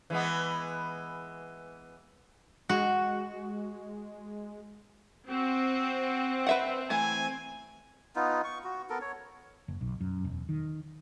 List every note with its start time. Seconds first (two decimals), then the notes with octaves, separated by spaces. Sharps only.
0.10 E3 G#3 B3
2.69 G#3 F#4
5.30 C4 F#4
6.47 B4 E5 F#5
6.90 E3 A3 G#5
8.16 B3 D#4 F4
8.44 C#6
8.64 F#4
8.90 B3 A4 A#4
9.01 C#5
9.68 F#1
9.81 B1
10.01 F#2
10.25 E1
10.49 D#3